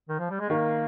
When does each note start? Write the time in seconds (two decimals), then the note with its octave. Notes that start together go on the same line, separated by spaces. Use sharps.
0.09 D#3
0.19 F3
0.30 G3
0.39 G#3
0.50 D#3 A#3